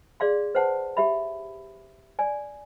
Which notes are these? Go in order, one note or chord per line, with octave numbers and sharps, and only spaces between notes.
G#4 D5 F5 C6
B4 C5 F#5 A5
G4 E5 B5
D5 G#5